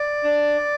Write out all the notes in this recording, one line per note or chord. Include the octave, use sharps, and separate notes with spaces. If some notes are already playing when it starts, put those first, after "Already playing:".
Already playing: D5
D4